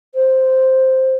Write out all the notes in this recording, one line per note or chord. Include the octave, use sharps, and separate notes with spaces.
C5